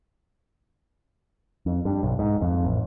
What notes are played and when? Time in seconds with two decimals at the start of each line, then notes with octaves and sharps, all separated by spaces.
1.66 F2
1.85 G2
2.03 B1
2.19 G#2
2.41 F2
2.65 A1